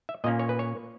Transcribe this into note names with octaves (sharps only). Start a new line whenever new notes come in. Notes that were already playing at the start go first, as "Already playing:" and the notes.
E5
A#2 A#3 C#4 D#5
C#5
B4
C#5